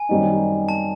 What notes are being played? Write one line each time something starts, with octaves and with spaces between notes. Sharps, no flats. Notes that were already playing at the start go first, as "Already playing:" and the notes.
Already playing: G#5
F#2 D#3 G3 C4 D#4
A5